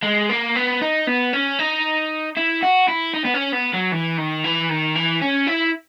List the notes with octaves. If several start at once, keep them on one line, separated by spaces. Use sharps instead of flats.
G#3
A#3
B3
D#4
B3
C#4
D#4
E4
F#4
E4
D#4
B3
C#4
B3
F#3
E3
D#3
E3
D#3
E3
C#4
E4